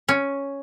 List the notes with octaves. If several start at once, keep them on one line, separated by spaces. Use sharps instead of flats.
C#4